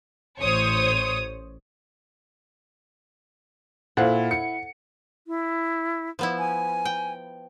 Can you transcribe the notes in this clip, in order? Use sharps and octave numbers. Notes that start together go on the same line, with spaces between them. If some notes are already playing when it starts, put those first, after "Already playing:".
A1 C5 C#5 D#6
A#2 E4 A4 C5 F5 F#5
C#7
E4
F3 B3 E4
G#5
G5